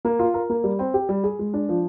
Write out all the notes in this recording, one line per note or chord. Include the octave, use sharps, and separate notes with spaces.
A#3
F4
A#4
A#3
G3
C4
G4
G3
G#4
G#3
D4
F3